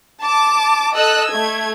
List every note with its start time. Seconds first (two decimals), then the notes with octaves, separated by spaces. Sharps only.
0.22 A5 D6
0.95 A4 D#5 E6 F#6
1.30 A3 G#6